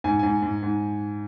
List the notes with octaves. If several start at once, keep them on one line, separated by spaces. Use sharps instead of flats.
G#2 G#5
G#2 G#5
G#2
G#2